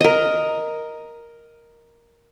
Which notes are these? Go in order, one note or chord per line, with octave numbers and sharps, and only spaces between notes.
A#4 D#5